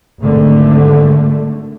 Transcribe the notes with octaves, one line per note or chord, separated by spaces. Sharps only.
G#1 D3 A3